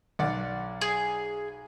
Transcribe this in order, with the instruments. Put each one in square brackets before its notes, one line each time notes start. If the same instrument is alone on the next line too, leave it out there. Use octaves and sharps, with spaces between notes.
[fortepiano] B1 D5 F#5
[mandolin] G#4